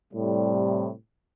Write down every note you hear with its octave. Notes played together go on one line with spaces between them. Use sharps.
A2 C3 G3